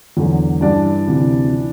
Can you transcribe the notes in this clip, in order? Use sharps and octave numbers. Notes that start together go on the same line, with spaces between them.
E2 D3 F#3
G2 E3 D4 D5
D2 C3 E3
E3